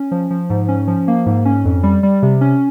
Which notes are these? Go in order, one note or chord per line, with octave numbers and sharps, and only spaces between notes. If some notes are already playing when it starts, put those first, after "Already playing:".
Already playing: C#4
F3
F3
G#2
C#4
F3
A#3
G#2
C#4
F2
G3
G3
C3
C#4